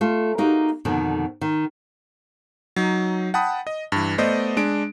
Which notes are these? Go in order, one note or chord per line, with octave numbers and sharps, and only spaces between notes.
A3 F4
A#3 D#4 F#4 G4
F2 B2 D3 D#3
D#3
F#3 D#4
F#5 G5 A5 B5 D#6
D#5
G2 E3
A3 B3 C5 D5 D#5
G#3 D4 D7